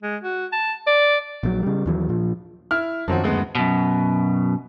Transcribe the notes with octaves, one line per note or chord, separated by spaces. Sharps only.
G#3
F#4
A5
D5
A#1 D3 F#3
C#3 G3
D#2 E3 F#3
A#2 F3
E4 F6
F#2 D#3 F3 F#3 C4 F#4
D2 G#3 B3
F#2 B2